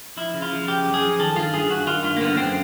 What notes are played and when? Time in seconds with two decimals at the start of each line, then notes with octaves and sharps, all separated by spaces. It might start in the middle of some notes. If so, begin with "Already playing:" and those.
0.17 F3 E4
0.34 C#3
0.42 F4
0.51 F3
0.68 C#3 G4
0.85 F#2
0.94 G#4
1.02 F3
1.19 D#3 A4
1.35 G2 F4
1.53 G2 G#4
1.70 G2 F#4
1.86 D#3 F4
2.03 G2 F4
2.17 A#3
2.20 D3 B3
2.37 F#2 C4